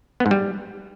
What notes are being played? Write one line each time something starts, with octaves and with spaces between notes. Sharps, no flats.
B3
G#2
G3